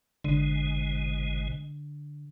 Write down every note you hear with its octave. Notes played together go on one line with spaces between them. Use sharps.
G#1 B2 D3 G#3